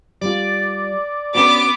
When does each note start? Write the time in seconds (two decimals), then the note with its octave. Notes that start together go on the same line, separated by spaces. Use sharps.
0.21 G3 F4 D5
1.35 B3 C#4 D4 F#4 D6